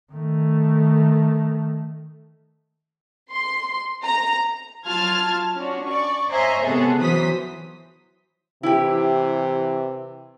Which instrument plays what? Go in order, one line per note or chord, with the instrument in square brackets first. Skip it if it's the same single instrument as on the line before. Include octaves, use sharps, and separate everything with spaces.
[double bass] D#3 A3
[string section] C6
A#5
F#3 F4 A5 F6 G#6
C#4 D4 F#4
D5 C#6
C5 C#5 D#5 E5 G#5 A#5
C3 G#3 B3 C#4 G#4 A4
E3 F#3 C5 D#6 B6
[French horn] C3 [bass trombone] E3 [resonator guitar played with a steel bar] E4 G4